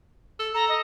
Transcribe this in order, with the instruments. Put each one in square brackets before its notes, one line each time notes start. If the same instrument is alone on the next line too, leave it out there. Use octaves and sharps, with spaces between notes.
[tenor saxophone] A4
[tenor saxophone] A4 [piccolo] A#5
[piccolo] D#5